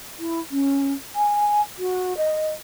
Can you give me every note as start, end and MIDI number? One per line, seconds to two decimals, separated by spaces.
0.19 0.40 64
0.51 0.93 61
1.16 1.61 80
1.79 2.17 66
2.17 2.53 75